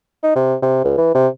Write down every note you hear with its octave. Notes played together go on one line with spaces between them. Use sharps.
D#4
C3
C3
C#2
E3
C3